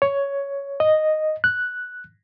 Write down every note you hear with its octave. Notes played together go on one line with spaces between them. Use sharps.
C#5
D#5
F#6